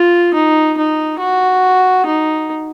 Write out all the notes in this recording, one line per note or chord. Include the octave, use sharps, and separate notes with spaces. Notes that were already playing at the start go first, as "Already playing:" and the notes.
Already playing: F4
D#4
D#4
F#4
D#4